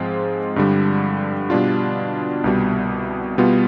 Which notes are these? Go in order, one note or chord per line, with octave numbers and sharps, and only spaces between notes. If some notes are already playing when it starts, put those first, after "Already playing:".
Already playing: G#2 F3 G#3 C4 F4
G2 D3 G3
B2 G3 D4 F4
C2 B2 G3
B2 G3 B3 F4